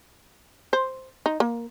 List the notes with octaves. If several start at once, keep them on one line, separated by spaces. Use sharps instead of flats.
C5
D#4
A#3